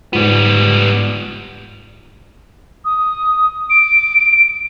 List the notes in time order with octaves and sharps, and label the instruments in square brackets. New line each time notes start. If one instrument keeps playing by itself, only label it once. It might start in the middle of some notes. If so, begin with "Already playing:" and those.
[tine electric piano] G#2 F4 [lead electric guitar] G3 B3
[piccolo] D#6
D7